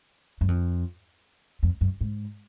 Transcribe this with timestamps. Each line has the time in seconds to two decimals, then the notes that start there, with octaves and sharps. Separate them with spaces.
0.41 F#2
0.48 F2
1.63 F2
1.81 F#2
2.01 G#2